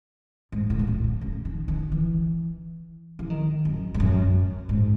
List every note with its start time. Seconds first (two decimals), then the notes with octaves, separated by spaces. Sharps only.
0.52 G#2
0.70 A2
0.79 B2
0.87 A2
1.04 B2
1.21 C#3
1.45 D#3
1.68 D#3
1.92 E3
3.19 E3
3.30 D#3
3.65 F#2
3.94 G#2
4.00 F#2
4.69 G#2